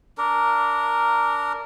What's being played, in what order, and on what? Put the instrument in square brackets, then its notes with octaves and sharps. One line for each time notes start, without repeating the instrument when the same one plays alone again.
[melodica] D4 A#4